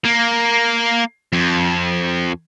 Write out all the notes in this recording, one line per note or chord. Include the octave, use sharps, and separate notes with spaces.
A#3
F2